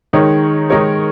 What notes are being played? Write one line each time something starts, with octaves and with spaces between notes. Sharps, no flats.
D#3 G#3 D#4 A#4 C#5
D#3 G#3 D#4 A#4 C#5